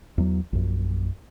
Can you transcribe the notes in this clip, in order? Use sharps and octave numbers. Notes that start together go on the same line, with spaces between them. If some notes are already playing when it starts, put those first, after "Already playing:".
E2 F#3
A#1 F#2